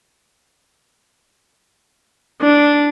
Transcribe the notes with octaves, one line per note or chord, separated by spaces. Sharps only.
D4